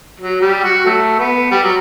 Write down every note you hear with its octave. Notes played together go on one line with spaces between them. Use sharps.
F#3
G3
F#4
F#3 A3
B3
G3
F#3